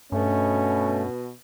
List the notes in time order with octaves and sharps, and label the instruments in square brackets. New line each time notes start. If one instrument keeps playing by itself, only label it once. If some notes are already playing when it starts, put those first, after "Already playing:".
[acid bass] G2 [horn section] B2 [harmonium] A3 [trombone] C#4